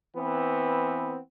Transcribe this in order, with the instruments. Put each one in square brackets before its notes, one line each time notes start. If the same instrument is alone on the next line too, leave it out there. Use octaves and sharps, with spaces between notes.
[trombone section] E3 B3 C4